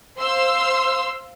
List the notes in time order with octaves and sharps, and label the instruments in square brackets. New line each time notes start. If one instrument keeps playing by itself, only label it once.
[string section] C5 F5 C6 E6